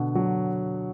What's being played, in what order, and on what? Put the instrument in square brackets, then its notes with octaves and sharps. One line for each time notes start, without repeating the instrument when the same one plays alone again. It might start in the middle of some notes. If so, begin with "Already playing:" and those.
Already playing: [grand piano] B2 D3
D3 F#3